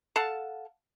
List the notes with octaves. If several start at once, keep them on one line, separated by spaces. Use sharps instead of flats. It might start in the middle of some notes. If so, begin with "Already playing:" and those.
A4 F5 F#5 A5